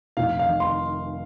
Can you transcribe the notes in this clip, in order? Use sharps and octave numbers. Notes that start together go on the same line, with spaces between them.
F1 F5
F5
D#3
C6